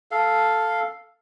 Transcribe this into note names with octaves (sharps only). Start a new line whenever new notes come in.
A4 F5